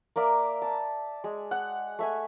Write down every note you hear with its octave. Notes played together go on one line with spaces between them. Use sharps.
A#3 A#4 D5 E5
A5
G#3
F#5
A3 E5 G#5